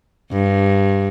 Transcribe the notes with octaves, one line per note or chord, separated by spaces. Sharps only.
G2